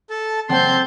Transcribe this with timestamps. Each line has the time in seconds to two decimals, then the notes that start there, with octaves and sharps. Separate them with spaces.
0.10 A4 A5
0.49 F#1 C4 F#5 G5 A5 C6 G6